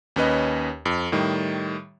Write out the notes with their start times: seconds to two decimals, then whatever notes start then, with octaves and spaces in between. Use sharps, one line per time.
0.16 D#2 C#4 B4 D#5
0.85 F2
1.12 A2 D#3 G3